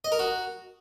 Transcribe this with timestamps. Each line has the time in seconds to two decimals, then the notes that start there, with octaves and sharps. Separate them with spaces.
0.04 D#5
0.12 A#4
0.19 F#4